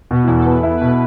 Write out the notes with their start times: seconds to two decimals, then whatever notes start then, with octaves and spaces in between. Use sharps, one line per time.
0.10 B2 B3
0.23 E2 E4
0.37 A4
0.46 B3 B4
0.63 E4
0.77 B2 B4